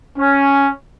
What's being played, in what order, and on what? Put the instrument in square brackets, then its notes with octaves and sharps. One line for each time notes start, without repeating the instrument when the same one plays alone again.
[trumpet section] C#4